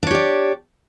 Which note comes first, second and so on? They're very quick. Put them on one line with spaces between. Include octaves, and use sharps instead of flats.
D4 C#5 G4 D5